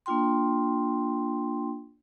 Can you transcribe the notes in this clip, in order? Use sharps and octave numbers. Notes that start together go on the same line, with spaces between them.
A#3 D4 F4 G5 C6